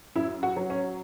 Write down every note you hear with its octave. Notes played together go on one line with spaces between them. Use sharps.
F#2 E4
F#4
F#3
C#4